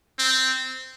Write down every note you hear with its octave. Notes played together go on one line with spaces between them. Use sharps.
C4